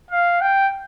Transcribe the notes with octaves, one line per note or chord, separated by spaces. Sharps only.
F5
G5